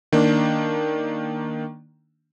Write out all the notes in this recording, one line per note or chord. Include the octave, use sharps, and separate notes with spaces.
D#3 A#3 D4